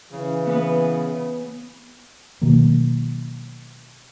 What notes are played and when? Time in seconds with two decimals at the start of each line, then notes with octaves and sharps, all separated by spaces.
0.12 C#3 E3
0.47 B3 B4
2.41 B2 D#3 F#3 A#3